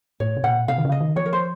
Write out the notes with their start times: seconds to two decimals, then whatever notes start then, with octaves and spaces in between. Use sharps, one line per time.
0.20 A2 C#5
0.37 C3
0.44 A#2 F#5
0.68 C3 F5
0.78 D#3
0.85 C#3
0.92 D#5
1.01 D#3
1.16 F3 C#5
1.26 A#4
1.33 C5